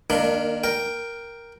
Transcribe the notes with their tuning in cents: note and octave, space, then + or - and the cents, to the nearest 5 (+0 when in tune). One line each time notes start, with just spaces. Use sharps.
D#3 -20 A#3 +0 D4 +10
A#4 +0 G5 +0